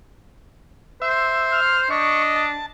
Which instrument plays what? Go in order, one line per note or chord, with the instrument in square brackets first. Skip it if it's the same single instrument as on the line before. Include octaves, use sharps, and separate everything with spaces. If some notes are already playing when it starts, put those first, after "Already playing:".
[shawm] C5 [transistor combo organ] E5
[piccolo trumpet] F6
[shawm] D4 [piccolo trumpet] D#5 [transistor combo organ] C#6
[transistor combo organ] A5